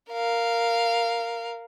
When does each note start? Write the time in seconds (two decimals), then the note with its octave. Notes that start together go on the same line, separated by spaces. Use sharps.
0.11 A#4 F5